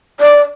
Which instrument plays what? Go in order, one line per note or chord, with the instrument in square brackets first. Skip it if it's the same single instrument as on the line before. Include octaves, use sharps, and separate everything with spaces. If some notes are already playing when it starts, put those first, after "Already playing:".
[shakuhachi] D5